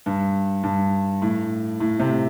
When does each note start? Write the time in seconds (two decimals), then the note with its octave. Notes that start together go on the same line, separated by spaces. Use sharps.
0.06 G2
0.63 G2
1.22 A2
1.80 A2
1.99 C3